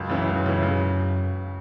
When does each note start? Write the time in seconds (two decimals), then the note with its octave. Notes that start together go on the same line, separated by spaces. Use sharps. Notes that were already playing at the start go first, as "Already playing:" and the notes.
Already playing: C#2 F#2
0.10 C#3 E3
0.27 C#2
0.46 C#3 E3
0.63 C#3